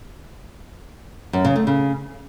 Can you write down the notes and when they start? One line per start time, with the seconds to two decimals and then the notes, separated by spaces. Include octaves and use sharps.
1.33 F#2
1.45 C#3
1.56 A3
1.67 C#3